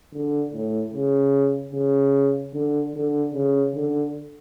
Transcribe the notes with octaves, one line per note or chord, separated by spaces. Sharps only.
D3
A2
C#3
C#3
D3
D3
C#3
D3